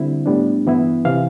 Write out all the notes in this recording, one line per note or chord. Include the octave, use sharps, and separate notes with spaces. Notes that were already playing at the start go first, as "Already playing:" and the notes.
Already playing: D3 G3 C4 E4
A2 G3 B3 D4
G2 E3 B3 E4
C3 E3 F5